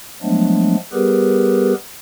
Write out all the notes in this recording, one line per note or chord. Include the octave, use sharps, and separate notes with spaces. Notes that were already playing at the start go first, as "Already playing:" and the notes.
F3 F#3 G#3 A3 B3 D4
G3 B3 G4 G#4 A#4 B4